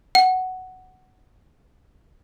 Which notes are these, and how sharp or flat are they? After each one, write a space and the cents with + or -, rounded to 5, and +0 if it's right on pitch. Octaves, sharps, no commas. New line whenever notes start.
F#5 +10